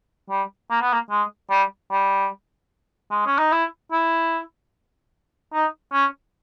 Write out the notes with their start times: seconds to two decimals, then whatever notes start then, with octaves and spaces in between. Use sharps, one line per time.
0.30 G3
0.70 A#3
0.81 B3
0.93 A#3
1.10 G#3
1.50 G3
1.91 G3
3.11 G#3
3.26 C#4
3.39 D#4
3.52 E4
3.92 E4
5.53 D#4
5.93 C#4